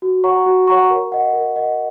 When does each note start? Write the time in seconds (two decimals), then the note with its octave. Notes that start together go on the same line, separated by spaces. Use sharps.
0.02 F#4
0.24 C#5 F#5 A#5 C#6
0.46 F#4
0.67 C#5 F#5 A#5 C#6
0.90 A#4
1.12 D#5 F#5
1.33 A#4
1.56 D#5 F#5